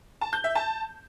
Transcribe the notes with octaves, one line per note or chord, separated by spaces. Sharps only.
A5
G6
E5
A5